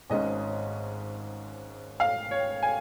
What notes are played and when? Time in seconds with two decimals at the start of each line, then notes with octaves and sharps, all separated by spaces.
0.10 G#1 G#2 G#3 C#4 D#5
2.00 F5
2.31 C#5
2.63 G#5